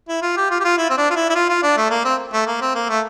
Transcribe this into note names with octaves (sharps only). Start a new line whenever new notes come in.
E4
F4
G4
F4
G4
F4
E4
C4
D4
F4
E4
E4
F4
F4
D4
A3
A#3
C4
A3
A#3
C4
A#3
A3